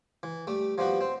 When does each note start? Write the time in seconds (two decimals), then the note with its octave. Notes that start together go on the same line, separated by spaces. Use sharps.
0.23 E3
0.47 G3 A3
0.78 F3 G3 B3 F#4
1.01 C4